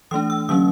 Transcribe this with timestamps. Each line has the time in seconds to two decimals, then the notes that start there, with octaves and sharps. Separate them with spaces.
0.11 E3 A3 D4 D#6
0.30 E6
0.49 D3 F#3 A#3 C#4 D#6